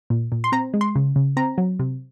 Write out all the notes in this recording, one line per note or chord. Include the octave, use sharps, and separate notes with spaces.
A#2
A#2
C6
C4 A#5
G#3
C6
C#3
C#3
C4 A#5
F#3
C3